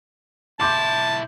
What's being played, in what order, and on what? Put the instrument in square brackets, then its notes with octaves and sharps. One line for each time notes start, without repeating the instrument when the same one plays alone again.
[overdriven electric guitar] B1 E4 [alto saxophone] A5 [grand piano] C6 D6 G6